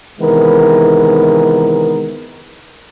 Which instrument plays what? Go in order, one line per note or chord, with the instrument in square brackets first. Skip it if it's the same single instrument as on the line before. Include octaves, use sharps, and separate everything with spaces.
[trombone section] C3 D#3 E3 G#3 B3 A#4